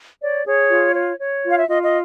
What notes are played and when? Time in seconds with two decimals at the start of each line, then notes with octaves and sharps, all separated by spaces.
0.21 C#5 D5
0.46 G#4 C#5
0.70 F4
0.94 C#5
1.18 C#5
1.43 F4
1.50 F5
1.58 E5
1.67 F4 D#5
1.83 D#5